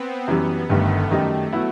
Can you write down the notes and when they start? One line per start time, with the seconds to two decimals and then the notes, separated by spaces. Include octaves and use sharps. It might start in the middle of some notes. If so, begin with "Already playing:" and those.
Already playing: B3 C4
0.28 F#2 E3 G3
0.69 G1 G2 D#3 A3
1.10 F#2 D#3 G3 A3 D#4 G4
1.53 F#3 B3 E4